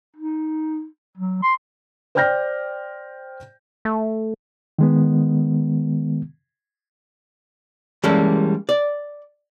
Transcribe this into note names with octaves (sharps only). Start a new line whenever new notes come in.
D#4
F#3
C6
C5 D5 G5 F6 G6 A#6
A3
D#3 G#3 B3
E3 G3 G#3 A#3 C#4 A4
D5